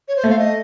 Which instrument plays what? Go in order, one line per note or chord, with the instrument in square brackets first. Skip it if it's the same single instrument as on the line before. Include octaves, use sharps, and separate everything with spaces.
[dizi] C#5
C5
[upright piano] A3
[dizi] F5
D#5